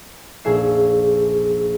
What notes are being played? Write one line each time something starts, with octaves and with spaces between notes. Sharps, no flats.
F1 A#1 G#4 E5 C7